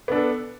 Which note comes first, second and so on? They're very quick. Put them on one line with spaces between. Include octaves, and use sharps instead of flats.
B3 D4 A4